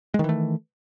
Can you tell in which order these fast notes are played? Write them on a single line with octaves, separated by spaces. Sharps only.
G#3 D#3 E3 A3